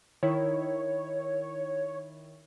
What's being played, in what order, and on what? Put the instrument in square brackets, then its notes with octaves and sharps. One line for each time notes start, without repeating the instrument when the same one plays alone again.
[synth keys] D#3 E4 [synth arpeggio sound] C#5